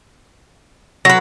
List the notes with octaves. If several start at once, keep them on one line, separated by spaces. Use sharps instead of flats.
F#3 B4 A#6